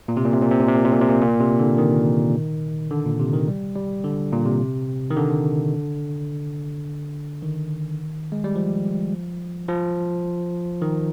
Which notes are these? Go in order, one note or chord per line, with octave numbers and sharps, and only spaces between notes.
A#2
C3
A#2
C3
A#2
C3
A#2
C3
A#2
C3
A#2
C3
A#2
A#2
C3
D3
D#3
D3
A#2
C3
D#3
G3
G3
D3
A#2
C3
D#3
D3
D#3
G#3
G3
F3
F3
D#3